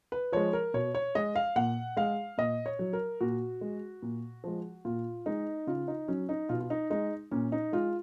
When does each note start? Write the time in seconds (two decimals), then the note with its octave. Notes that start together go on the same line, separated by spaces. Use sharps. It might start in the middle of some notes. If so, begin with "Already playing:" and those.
0.12 B4
0.33 F3 G#3 C#5
0.53 A#4
0.74 B2 C#5
0.95 C#5
1.15 G#3 D#5
1.36 F5
1.56 A#2 F#5
1.97 G#3 F5
2.38 A#2 D#5
2.66 C#5
2.79 F#3
2.93 A#4
3.21 A#2 F#4
3.61 G#3
4.02 A#2
4.44 F3 G#3
4.85 A#2 F4
5.26 G#3 D#4
5.67 C#3 F4
5.88 D#4
6.08 F#3 C#4
6.29 D#4
6.49 B2 F4
6.60 F4
6.70 D#4
6.90 G#3 D#4
7.31 A#2 C#4
7.52 D#4
7.73 G#3 F4